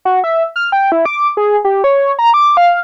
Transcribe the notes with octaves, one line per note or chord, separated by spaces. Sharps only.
F#4
E5
F6
G5
E4
D6
G#4
G4
C#5
A#5
D6
F5